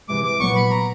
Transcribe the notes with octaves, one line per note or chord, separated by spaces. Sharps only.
C3 E3 G#3 D6
D6
A#2 F#3 B3 C#6
B5
A#5